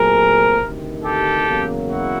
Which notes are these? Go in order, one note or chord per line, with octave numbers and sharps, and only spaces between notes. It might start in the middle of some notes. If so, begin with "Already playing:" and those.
Already playing: A#2 F#3 A3 C4 G#4 A#4
D2 C3 D#3
G4 A4
E2 C#3 F#3 A#3
E4 F#4